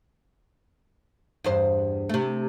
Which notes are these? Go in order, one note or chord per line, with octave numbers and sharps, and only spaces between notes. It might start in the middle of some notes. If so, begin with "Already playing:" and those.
E2 G2 C5
C3 A3